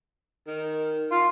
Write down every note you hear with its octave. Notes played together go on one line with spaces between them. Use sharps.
D#3
F4